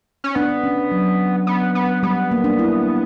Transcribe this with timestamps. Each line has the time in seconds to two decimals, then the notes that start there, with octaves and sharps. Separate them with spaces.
0.24 C#4
0.35 B3 D4
0.63 C#4
0.92 F#3
1.47 B3
1.75 B3
2.03 G3 B3
2.31 A#3
2.44 D4
2.59 E4